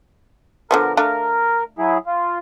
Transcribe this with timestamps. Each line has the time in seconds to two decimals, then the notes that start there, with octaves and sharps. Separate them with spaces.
0.71 D3 F3 B3 A#4
0.97 A3 D4 A#4 F5
1.78 F#3 E4 G#4
2.06 F4